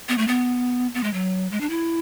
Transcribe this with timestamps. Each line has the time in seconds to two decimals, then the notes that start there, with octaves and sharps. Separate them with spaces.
0.09 B3
0.18 A3
0.28 B3
0.94 B3
1.03 G#3
1.13 F#3
1.52 G#3
1.61 D4
1.70 E4